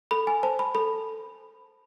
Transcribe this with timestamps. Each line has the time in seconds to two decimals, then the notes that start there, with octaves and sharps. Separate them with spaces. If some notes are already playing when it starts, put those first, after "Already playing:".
0.11 A4 B5
0.27 G#5
0.43 C5 A5
0.59 B5
0.75 A4 B5